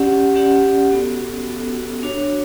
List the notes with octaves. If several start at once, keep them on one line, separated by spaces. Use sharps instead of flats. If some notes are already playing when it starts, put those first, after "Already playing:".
Already playing: C#4 G4 D5 F#5
C#4 G4 D5 F#5
B3 F#4 A4
B3 F#4 A4
D4 F#4 C#5